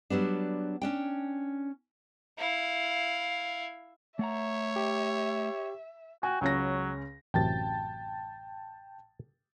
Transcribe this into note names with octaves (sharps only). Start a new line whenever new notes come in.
F#3 G3 B3 D4
C#4 D4 G5
E4 F5
A3 C#5 E5 F#5 A#5
G4
F#4 G5 G#5
C#2 F#3 C#4 A#6
A1 F#2 C3 G5 A5 A6